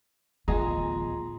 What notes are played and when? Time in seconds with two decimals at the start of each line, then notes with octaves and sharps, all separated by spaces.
0.48 D1 E3 B3 F4 G#4 D#5 G#5 A#5